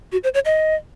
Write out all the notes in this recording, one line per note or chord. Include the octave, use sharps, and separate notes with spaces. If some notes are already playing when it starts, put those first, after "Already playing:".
F#4
C5
C#5
D#5